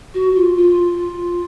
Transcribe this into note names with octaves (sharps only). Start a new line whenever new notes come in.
F#4
F4
F4